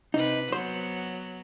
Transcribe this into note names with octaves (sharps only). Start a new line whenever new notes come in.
C3 D#4 B4
F#3 B3 C5